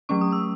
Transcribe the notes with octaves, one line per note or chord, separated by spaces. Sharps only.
F#3 A3 C#4 C#6
D#6
E6